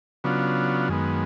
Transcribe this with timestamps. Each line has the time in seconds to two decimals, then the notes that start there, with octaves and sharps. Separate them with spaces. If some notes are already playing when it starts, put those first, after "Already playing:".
0.24 C#3 F#3 B3 D4 F4
0.88 F#2 D#3 G#3 B3